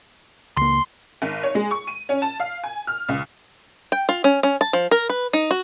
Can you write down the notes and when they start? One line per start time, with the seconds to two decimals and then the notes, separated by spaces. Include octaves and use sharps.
0.57 C#2 A#3 C6
1.22 G#1
1.43 C#5
1.55 G#3
1.71 C#6
1.87 D#7
2.09 C#4
2.22 A5
2.40 F5
2.64 G#5
2.87 F6
3.09 C#2
3.92 G5
4.09 F4
4.24 C#4
4.43 C#4
4.61 A5
4.73 F3
4.91 A#4
5.09 B4
5.33 D#4
5.51 F#4